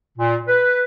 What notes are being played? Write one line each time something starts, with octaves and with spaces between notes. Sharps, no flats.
A#2
B4